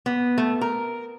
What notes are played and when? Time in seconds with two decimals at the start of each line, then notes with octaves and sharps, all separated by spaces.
0.06 B3
0.38 A3
0.61 A#4